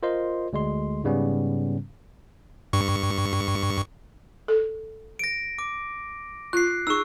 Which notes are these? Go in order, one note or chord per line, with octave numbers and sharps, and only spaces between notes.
F4 A#4 C5 D#5 C6
D2 G#3 C6
G#2 C#3 G3 B3 C#4
G2 C#6
A4
A#6 D7
D6
F4 F#6 C7
D#4 G#4 C#6 E6